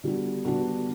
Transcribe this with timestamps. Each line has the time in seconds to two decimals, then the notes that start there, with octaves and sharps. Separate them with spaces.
0.04 D3 G3 B3 D4 F#4
0.45 D3 G3 B3 D4 F#4